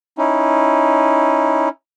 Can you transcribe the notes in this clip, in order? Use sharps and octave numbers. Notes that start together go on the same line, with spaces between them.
C#4 D#4 E4